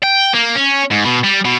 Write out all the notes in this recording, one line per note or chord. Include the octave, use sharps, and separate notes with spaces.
G5
A#3
C#4
G#2
B2
G3
B2